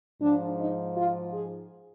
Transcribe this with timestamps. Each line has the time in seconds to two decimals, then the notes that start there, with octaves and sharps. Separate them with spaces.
0.21 G#2 F3 D4
0.58 D#4
0.95 F4
1.32 G#4